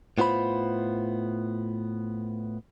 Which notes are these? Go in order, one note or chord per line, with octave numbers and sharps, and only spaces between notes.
A2 B3 F4 C5 B5